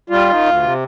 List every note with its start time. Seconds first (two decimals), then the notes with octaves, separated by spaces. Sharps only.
0.10 G3 F4
0.28 D#3
0.46 D2
0.63 C3